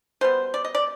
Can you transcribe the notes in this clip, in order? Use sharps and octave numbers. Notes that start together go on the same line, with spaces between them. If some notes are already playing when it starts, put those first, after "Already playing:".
B2 G3 B3 C5
D5
D#5
D5